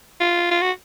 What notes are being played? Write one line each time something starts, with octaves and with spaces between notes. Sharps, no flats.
F4
F4
F#4